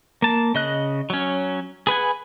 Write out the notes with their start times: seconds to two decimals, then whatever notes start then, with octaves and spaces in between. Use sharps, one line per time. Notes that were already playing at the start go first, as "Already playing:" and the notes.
0.22 A#3 A5
0.54 C#3 D#5 F#6
1.10 F#3 C#4
1.87 G#4 B4 F#5 G#5